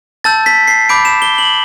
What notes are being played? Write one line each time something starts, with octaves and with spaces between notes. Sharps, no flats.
A5 E6 G6 A6
B6
C7
B5 D6 G6 D7
E7
G7
F#7